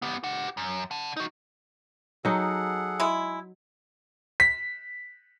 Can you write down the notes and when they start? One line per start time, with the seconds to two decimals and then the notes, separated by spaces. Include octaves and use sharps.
0.02 B3 G4
0.24 G4 F#5
0.57 F#2
0.91 F#5 A5
1.17 D#4 F#4
2.25 F#3 D#4 G#4 A4 F#5
3.00 G#3 E4
4.40 B6